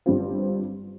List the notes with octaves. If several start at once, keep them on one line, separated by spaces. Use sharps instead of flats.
G1 G2 G3 C4 F4